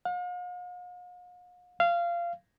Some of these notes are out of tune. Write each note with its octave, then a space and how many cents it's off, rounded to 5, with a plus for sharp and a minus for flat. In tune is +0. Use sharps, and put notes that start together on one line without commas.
F5 +45
F5 -20